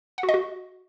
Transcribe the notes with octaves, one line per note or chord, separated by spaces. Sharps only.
F#5
F#4
D#5
F#4